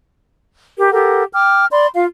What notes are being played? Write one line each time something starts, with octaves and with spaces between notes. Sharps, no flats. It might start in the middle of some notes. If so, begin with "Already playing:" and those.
G4 A#4
G4 A4 A#4 F#5
G5 D6 F6
D5 B5 C6
F4 F5